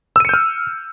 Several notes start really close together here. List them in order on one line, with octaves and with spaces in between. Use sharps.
E6 D#7 C#7 G6 F6